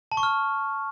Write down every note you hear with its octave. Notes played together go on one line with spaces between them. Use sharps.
A5
C#6
F6